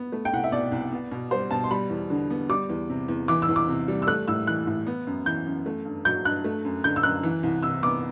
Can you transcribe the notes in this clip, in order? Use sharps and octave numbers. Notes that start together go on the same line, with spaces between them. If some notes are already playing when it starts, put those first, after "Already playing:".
Already playing: B3
A3
G5
C2 F#5
E5
B2 D5
C2
B3
B2
G3 C5
B2 A5
C6
G3 B5
E2
D3
B3
G3 D6
E2
C3
E2
E3 D6
E6
E2
D6
C3
G3
E6
A3 F#6
A2 E6
E3 F#6
A2
B3
F#2
E3 G6
F#2
A3
G2
F#3 G6
G2 F#6
A3
F#2
D3 G6
E6
F#2 F#6
E3
C2
C3 E6
B3 D6